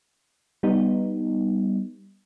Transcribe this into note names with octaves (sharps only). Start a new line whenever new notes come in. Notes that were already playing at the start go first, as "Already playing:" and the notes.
G3 B3 D#4